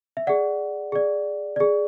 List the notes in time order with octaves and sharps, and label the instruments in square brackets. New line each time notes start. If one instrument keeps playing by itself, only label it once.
[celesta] E5
G#4 D5 F#5
G#4 D5
G#4 D5